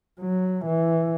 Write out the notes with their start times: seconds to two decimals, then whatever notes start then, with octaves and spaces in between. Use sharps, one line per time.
0.21 F#3
0.65 E3